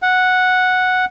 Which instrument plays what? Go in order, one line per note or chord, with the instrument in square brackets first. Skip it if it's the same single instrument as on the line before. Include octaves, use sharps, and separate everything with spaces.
[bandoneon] F#5